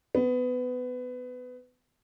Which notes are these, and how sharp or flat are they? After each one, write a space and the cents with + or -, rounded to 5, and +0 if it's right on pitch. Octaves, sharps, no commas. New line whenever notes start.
B3 +20